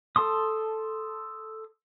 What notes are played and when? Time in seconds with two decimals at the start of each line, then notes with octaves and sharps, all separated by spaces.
0.16 A4 A5 C6 D#6